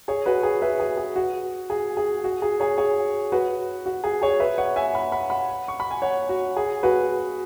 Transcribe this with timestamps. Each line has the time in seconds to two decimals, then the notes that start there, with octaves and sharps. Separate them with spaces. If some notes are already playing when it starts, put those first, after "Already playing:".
0.08 G#4 C#5
0.26 F#4 B4
0.43 G#4
0.62 B4 E5
0.79 G#4
0.97 G#4
1.16 F#4
1.70 G#4
1.97 G#4
2.24 F#4
2.42 G#4
2.60 G#4 C#5
2.78 G#4 C#5
3.32 F#4 B4
3.86 F#4
4.04 G#4
4.22 G#4 C#5
4.40 B4 E5
4.58 C#5 F#5
4.76 E5 G#5
4.94 F#5 B5
5.12 F#5 B5
5.30 F#5 B5
5.68 C#6
5.80 B5
5.91 G#5
6.02 C#5 F#5
6.29 F#4
6.56 G#4
6.83 F#4 B4